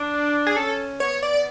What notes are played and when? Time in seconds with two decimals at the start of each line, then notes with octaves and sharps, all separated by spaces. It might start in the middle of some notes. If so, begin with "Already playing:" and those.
Already playing: D4
0.47 G#4
0.56 C#4 A4
1.00 B3 C#5
1.22 D5